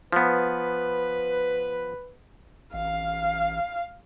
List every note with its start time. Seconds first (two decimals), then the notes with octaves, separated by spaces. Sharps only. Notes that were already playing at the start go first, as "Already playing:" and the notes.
0.12 F3 B3 B4
2.74 A1 F5